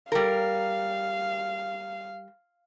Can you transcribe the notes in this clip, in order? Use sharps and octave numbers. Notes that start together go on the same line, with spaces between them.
G3 A#4 F5